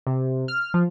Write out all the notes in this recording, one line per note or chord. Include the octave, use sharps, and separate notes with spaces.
C3
F6
F3